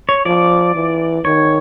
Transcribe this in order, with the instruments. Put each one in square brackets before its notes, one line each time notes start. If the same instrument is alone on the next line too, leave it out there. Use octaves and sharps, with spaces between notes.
[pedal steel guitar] C#5
[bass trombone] F3 [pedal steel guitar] D5
[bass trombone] E3
[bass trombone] D#3 [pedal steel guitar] C#5